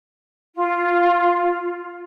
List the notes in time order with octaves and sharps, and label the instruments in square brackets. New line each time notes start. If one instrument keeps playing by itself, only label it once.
[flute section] F4